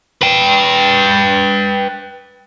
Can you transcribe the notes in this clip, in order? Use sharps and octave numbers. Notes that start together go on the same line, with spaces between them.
B4 G5